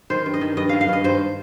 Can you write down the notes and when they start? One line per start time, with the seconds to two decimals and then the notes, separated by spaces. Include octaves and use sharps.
0.10 D#3 C5
0.26 G2
0.34 D#5
0.41 D#3
0.57 G2 D#5
0.69 D#3 F5
0.81 F5
0.88 G2 D#5
1.04 G2 C5